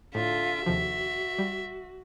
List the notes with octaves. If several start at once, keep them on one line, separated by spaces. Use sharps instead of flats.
A2 D3 F4 E5
D#2 C3 F3 F#4
G3